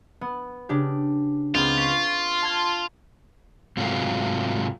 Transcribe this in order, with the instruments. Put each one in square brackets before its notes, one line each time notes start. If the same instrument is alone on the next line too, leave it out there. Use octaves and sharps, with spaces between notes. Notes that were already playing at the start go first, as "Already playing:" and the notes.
[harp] B3
C#3 D4 G4
[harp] C#2 B3 C4 [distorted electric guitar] F4
[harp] C#6 B6 D7
A5 F6 G#6
[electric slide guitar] G#2 C3 F#3 A3 F4